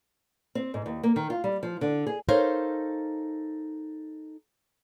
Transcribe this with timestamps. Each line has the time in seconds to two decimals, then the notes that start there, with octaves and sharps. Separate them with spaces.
0.55 C4
0.74 G#2
0.86 D#2
1.03 A#3
1.16 D#3
1.30 F4
1.44 G3
1.63 F3
1.81 D3
2.06 G#4
2.29 D#4 A4 A#4 C5 C#5 F5